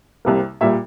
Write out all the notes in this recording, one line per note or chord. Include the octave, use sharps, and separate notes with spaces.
C2 C3 G3 A#3
A#2 G3 A#3 E5